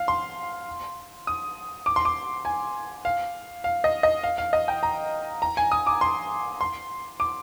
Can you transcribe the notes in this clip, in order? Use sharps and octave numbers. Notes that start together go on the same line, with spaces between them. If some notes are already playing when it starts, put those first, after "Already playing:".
Already playing: F5
C6
D#6
D6
C6
D6
G#5
F5
F5
D#5
D#5
F5
F5
D#5
G5
A#5
A#5
G#5
D#6
D6
C6
C6
D6